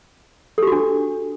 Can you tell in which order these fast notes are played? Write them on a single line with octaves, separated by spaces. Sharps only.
A4 G4 F#4 D4